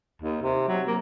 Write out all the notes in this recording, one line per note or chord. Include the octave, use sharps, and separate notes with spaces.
D#2
C3
F#3
A#3